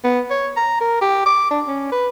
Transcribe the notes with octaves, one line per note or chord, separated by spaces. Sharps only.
B3
C#5
A#5
A#4
G4
D6
D4
C#4
B4